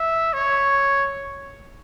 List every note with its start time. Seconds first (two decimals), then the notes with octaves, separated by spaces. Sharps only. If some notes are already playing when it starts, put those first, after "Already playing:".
Already playing: E5
0.33 C#5